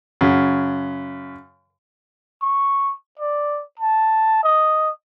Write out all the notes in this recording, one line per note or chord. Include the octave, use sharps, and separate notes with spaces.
F#2 C#3
C#6
D5
A5
D#5